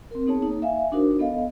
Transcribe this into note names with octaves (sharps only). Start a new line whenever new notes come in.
C4 A#4
B3 D#4 G#4 C#5 A5
A#3 D#4
E5 F5 G#5
D4 D#4 F#4 A#4 C5
B3 A4 D#5 F5